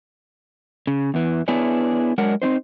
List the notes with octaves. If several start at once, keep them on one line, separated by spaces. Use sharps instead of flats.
C#3
E2 E3
B3 D4 E4 G#4 B4 C#5
F#3 G#3 D4 A#4 F#5
C4 C#4 D#4 C5